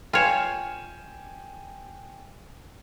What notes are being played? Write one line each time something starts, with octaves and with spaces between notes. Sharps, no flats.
F4 C#5 G5 G#5 E7